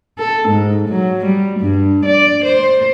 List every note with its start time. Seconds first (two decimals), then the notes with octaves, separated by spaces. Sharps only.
0.19 A4
0.49 G#2
0.89 F#3
1.25 G3
1.60 G2
2.05 D5
2.45 C5